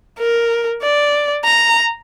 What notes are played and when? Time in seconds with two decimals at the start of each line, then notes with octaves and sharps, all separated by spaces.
0.19 A#4
0.82 D5
1.44 A#5